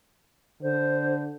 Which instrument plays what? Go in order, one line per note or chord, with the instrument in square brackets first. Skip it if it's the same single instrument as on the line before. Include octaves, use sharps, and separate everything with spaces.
[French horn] D3 [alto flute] C5